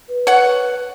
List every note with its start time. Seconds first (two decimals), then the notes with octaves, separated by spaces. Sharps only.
0.09 B4
0.27 C#5 F#5